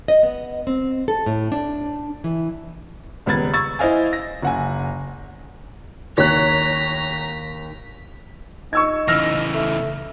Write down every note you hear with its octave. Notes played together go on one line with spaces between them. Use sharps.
D#5
B3
C4
A4
A2
D4
E3
D#1 C#2 B3 B5 G#6 A6
C#6 E6 G#6 A6
E4 C5 D#5 F5 G#5
A#6
F#1 F#5 G#5
D#2 C#5 A#5 F#6 B6
D#4 C#6 E6 G#6
C#3 E3 E6 F6 A#6
A3